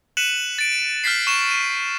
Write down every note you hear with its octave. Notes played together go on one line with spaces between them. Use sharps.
F#6 B6 C#7 D#7 E7 F#7
A6 D7
F6 G6 A6 B6 C7
C#6 E7
D#7